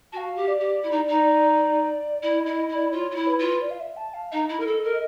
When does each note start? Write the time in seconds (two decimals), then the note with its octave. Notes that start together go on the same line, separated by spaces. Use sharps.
0.12 F#4 F5 A5
0.36 G4
0.48 D5
0.60 G4
0.83 E4
0.91 D#4
1.08 D#4
2.22 E4 D5
2.40 D#5
2.46 E4
2.57 D#5
2.69 E4
2.75 D5
2.92 F4 C#5
3.11 F4
3.15 E4
3.27 B4
3.39 F4
3.62 D5
3.71 F5
3.80 E5
3.97 A5
4.14 F5
4.32 D#4 D#5
4.49 E4
4.59 A#4
4.66 A4
4.84 A#4